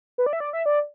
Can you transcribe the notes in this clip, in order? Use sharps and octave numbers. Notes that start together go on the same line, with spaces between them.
B4
D5
E5
D5
E5
D5